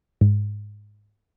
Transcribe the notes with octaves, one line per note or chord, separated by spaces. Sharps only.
G#2